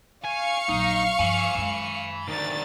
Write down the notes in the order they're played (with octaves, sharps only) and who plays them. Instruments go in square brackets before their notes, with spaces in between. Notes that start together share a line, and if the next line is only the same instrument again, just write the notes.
[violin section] F5 C#6 C#7 [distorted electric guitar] G#5
[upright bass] A#1 F#3 [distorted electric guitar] D#4
[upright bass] G2 F3 [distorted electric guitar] G#5 B5
[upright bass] F#2 G#3
[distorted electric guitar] D2 D#3 [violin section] D5 A6